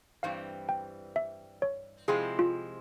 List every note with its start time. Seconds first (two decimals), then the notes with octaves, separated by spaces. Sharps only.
0.23 G2 E3 G3 C4 F5
0.69 G5
1.16 E5
1.62 C#5
2.08 C3 F3 G#3 C4 E4 G#4
2.39 F4